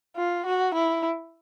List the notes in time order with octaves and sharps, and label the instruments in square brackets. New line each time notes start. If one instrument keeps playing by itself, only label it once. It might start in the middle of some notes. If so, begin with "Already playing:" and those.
[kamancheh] F4
F#4
E4